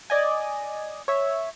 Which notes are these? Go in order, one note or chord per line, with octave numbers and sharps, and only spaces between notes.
D5 D#5 G#5
C#5 E5